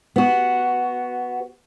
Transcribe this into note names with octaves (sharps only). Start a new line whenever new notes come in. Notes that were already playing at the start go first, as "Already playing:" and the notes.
B3 F#4